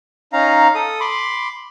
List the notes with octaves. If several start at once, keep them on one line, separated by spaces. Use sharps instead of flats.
C#4 D#4 F5 A#5
A4 D#6
B5 C6 D6